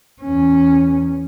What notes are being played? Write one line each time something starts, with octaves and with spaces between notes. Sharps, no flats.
E2 C#4